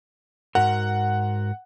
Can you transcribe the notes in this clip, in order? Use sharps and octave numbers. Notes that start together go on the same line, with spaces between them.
G#2 F#4 A#4 F#5